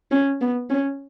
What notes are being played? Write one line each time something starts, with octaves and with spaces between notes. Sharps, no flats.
C#4
B3
C#4